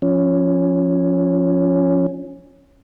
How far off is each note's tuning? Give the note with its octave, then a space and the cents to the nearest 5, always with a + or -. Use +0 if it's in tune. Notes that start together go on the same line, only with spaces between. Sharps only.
F3 +5 C#4 +0